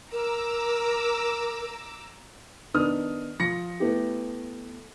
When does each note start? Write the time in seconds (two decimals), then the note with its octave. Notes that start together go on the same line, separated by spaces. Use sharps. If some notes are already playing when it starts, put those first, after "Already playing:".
0.12 A#4 A#5 D6 E6
2.74 D#3 B3 D4 D#6 F6
3.40 F3 A#6 C#7
3.80 A3 B3 E4 G4